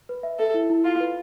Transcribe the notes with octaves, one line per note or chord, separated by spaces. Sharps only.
B4
E5
A4 E5
E4
E4
F4 F5
B4